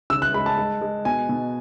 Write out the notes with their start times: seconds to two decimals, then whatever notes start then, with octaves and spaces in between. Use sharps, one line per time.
0.10 C#3 E6
0.22 F#6
0.34 G#3 B5
0.46 A5
0.57 G#3
0.81 G#3
1.05 B2 G#5
1.29 B2